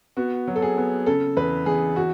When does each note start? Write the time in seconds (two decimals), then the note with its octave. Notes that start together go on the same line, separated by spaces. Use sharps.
0.17 B3 F#4
0.47 F#3
0.56 A4
0.62 G#4
0.77 B3
1.06 C#3 A4
1.37 E2 B4
1.66 E2 G#4
1.96 F#4